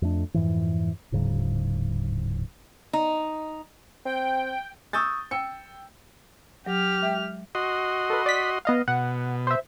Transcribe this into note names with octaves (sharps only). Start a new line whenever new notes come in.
F2 A3 D4
F2 G#2 E3
D1 G#2 C#3 F#3
D#4
C4 G5
C#6 D#6 E6 G6 A6
G5 E6 C#7
F#3 G4 F6
G#3 E5 G5
F#4 D#5 C6
A4 B4
D5 B6
B3 D#5 F5
B2 F#5
C5 E5